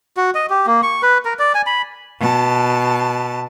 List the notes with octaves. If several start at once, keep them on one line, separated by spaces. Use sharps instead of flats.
F#4
D#5
G4
A#3
C#6
B4
A#4
D5
G#5
B5
B2 A5